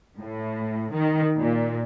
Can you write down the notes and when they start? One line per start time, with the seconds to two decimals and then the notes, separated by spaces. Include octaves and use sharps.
0.21 A2
0.93 D#3
1.37 A#2